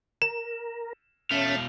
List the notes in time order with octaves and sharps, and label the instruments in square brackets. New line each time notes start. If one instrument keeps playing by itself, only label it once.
[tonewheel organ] A#4 [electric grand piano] E7
[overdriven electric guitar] B2 F5 [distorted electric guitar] A3 [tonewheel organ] C#4